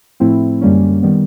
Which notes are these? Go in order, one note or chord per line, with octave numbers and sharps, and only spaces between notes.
A2 F3 A3 C4 E4
F#2 D3 G3 A#3 C#4
D#3 G3 B3